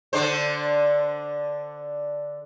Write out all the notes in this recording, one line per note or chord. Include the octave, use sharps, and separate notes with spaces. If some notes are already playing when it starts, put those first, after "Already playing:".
D3 D4 C5